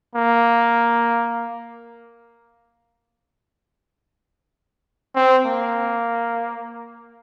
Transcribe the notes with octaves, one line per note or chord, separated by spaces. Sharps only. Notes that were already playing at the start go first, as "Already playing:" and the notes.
A#3
C4
A#3